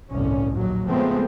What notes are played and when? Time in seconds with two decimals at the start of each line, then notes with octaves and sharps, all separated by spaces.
0.11 G1 C2 A2 C#4
0.56 A#1 D#2 F#3
0.86 C#3 F3 G#3 A3 B3 C4